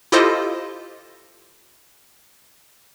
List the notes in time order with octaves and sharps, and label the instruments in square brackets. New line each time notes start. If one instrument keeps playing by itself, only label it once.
[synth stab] E4 F4 G4 A4 C5 D#5